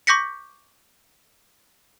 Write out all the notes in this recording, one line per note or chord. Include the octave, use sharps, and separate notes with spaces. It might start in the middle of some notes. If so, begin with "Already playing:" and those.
C#6 D6 G6 A#6 B6 C#7